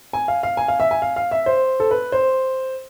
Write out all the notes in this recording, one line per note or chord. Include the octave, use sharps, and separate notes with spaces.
G#5
F5
F5
G#5
F5
E5
G#5
F5
F5
E5
C5
A4
B4
C5